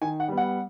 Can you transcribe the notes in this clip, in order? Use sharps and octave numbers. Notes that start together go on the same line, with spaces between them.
D#3 G#5
F#5
G3 B3
F#5